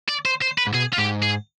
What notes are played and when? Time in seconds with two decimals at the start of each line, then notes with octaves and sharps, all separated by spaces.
0.09 D5
0.25 C5
0.42 C5
0.58 B4
0.67 G#2
0.74 B2 G#4
0.93 F4
0.98 G#2 G4
1.22 G#4